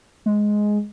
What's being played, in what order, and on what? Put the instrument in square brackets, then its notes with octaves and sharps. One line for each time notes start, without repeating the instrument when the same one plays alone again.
[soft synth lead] G#3